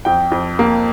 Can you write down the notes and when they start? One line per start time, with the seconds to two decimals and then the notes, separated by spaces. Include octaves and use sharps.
0.05 F2 G5
0.32 F2
0.59 A#3